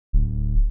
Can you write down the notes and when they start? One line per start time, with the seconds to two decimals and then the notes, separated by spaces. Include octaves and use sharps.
0.13 D1